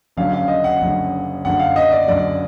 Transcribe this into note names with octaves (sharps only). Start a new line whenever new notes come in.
F#1 F#2 D3 F5
F5
D#5
F#5
F#1 F#2 D3
F#1 F#2 D3 F#5
F5
D#5
D5
F#1 F#2 D3 D5